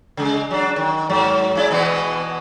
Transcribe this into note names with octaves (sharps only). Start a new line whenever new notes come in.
C#3 G#3
F#3 D4
D#3
G#2 F#3
G#3 E4 D5
B2 E3 B3